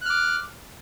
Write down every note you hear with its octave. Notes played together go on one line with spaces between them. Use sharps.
D6 F6 F#6